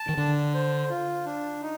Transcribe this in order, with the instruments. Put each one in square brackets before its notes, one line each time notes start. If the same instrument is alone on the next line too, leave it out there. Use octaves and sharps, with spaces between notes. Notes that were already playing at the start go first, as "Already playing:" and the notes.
Already playing: [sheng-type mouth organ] A5
[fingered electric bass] D#3
[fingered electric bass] D3 [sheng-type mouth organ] D4
[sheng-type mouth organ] C5
F4
D4
D#4